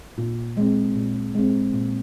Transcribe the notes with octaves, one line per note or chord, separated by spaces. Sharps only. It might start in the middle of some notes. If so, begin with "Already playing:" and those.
A#2
G#3 C4
A#2
G#3 C4
A#2